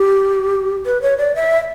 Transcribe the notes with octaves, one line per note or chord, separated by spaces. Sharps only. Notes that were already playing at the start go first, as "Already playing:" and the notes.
Already playing: G4
B4
C#5
D5
E5